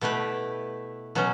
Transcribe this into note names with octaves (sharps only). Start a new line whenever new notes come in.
B2 A3 E4 G4 B4
B2 F#3 C#4